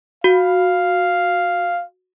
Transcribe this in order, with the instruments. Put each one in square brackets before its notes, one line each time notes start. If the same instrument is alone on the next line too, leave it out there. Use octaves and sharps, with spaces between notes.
[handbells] F#4 [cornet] F5